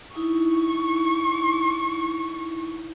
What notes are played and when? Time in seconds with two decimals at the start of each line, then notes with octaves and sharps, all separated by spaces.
0.15 D#4 E4 C#6